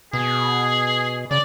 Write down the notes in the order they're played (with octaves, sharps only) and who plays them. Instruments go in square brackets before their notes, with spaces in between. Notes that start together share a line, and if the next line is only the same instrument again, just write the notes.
[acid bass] B2 [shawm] G#4
[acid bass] C#3 [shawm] D5